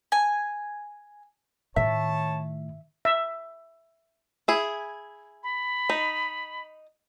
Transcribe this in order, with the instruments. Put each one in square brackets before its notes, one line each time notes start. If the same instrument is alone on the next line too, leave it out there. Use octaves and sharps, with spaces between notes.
[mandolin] G#5
[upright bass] A2 D#3 [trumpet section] C#5 A5 [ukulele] E5
[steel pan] E5
[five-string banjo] E4 G#4
[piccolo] B5
[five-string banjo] D#4